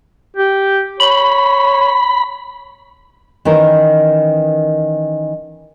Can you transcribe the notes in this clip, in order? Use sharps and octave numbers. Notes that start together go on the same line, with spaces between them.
G4
C#5 B5
D#3 E3 C#4 A#4